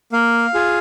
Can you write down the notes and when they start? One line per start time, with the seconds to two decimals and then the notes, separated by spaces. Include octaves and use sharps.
0.13 A#3 F5
0.54 F4 G#4